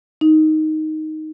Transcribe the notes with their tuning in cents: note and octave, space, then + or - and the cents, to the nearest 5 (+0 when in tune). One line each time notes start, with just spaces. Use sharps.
D#4 +5